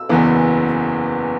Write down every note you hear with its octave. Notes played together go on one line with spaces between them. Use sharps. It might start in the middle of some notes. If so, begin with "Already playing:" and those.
Already playing: E6
F#1 E2 E3 B3